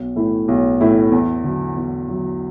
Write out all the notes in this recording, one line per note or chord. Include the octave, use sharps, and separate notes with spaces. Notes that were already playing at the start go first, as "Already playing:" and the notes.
Already playing: B1
A2 E3 A3 E4
B1
A2 E3 A3 E4
E2
D3 F#3
E2
D3 F#3